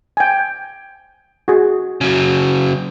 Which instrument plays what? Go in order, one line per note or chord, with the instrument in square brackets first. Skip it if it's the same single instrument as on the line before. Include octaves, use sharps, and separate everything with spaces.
[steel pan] G5 G#5
F#4 G#4
[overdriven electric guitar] C#3 F#3